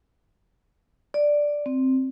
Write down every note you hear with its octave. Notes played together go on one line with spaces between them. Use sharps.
D5
C4